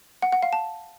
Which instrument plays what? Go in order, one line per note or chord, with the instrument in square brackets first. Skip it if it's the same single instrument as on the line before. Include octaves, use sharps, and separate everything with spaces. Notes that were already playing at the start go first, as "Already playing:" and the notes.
[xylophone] F#5
F#5
F5
A5